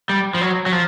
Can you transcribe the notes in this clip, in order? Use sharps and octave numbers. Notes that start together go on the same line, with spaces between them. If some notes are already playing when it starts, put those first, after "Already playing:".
G3
F3
F#3
F#3
F3